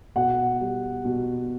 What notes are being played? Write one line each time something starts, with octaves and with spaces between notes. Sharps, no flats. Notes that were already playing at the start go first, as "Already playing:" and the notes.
B2 F#5
G3
B2